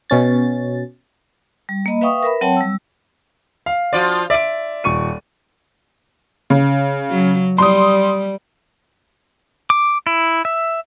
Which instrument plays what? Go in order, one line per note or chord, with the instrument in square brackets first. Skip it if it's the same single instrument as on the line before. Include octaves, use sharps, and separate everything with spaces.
[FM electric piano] B2 C#4 A6
[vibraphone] G3
A#3 D#5 B5
B4 E5 F5 G5 C#6 D#6
A#4 B4 E5 B5
F#3 C4 C#5 F#5 G5 A5
G3 E6
[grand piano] F5
[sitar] F3 F4 D5 [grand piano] F#4
[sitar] D5 [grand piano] E5 D7
[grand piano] D#1 C#6 D#7
[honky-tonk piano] C#3
[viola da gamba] F#3
[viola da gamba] G3 [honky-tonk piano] C6 D#6
[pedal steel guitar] D6
E4
E5